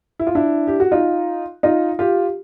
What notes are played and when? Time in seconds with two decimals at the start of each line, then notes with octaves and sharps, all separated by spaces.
0.19 E4
0.27 F4
0.35 D4 E4
0.67 G4
0.80 F#4
0.92 D#4 F4
1.63 D#4 F4
1.99 F4 G4